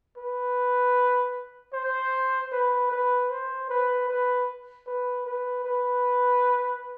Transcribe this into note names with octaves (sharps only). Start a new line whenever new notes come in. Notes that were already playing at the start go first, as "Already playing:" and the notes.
B4
C5
B4
B4
C5
B4
B4
B4
B4
B4